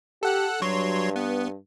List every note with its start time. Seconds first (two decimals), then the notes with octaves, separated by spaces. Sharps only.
0.23 G4 A4 F#5 F#6
0.62 G2 F#3 C#5 C6
1.16 B3